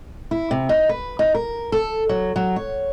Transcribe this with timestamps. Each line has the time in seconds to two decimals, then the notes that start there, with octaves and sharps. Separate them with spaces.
0.31 E4
0.51 C3
0.69 D#4
0.89 B4
1.19 D#4
1.34 A#4
1.72 A4
2.09 F#3
2.36 F#3
2.56 C#5